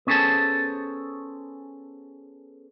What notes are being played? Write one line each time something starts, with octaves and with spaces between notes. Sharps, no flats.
B3 C#4 G#4 A4 C5 A5